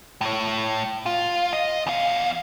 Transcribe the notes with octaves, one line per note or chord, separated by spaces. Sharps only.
A2 C#5
F4
D#5
E2 F5